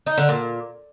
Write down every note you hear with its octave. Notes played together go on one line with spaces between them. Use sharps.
D#4
D3
A#2